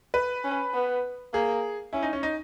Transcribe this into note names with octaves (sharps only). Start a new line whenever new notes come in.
B4
C#4
B3
A#3 G#4
C#4 E4
D#4
C#4
D#4